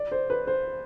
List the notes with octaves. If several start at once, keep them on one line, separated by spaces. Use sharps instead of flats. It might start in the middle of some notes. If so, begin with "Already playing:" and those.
Already playing: D5
C5
B4
C5